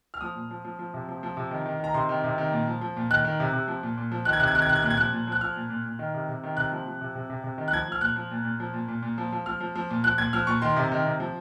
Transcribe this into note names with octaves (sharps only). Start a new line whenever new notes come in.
F6
F3 D#6
A#2
F3
F3
F3
C3
F3
F3
C3
D#3
D#3
D#3 A#5
C3 C6
D#3
C3
D#3
A#2
F3
F3
A#2
D#3 F#6
D#3
C3
C3
F3
A#2
A#2
F3
D#3 F#6
G#6
C3 F#6
G#6
D#3 F#6
G#6
C3 F#6
G#6
A#2 F#6
G#6
F3 F#6
A#2
F3
F#6
F3 F6
A#2
A#2
A#2
D#3
C3
C3
D#3
C3 F#6
F3
F3
C3
C3
C3
C3
D#3
F#6
F3 G#6
F3 F6
A#2 F#6
F3
A#2
A#2
F3
A#2
A#2
A#2
F3
F3
F3 F6
F3
F3
A#2
F3 F#6
A#2 G#6
F3 F6
A#2 C#6
D#3 C6
C3
D#3
C3
F3